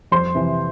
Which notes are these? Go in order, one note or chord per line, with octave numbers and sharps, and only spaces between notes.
F2 C5 C6
C3 E3